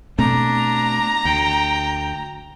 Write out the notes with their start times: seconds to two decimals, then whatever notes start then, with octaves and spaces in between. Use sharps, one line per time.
0.19 B2 A3 C4 D4 A#5
1.25 D2 G5